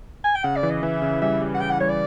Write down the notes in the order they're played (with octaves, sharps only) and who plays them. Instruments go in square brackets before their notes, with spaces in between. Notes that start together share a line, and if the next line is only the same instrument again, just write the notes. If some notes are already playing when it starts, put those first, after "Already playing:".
[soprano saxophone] G#5
G5
[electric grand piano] C#3 [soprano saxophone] F#5
[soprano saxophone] D5
[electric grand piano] E3
[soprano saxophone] D#5
[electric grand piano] E3 [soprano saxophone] E5
[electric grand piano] C#3
[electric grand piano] G3 [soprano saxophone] E5
[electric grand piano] G3
[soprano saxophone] F#5
[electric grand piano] C#3 [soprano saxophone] G5
[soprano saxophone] F#5
[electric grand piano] G3 [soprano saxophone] C#5
[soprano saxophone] D5